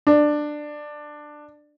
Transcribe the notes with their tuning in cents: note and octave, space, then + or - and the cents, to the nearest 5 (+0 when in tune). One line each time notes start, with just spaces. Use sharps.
D4 +15